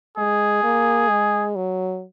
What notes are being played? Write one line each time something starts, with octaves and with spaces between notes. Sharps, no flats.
G#3 G#4
A#3
G#3
F#3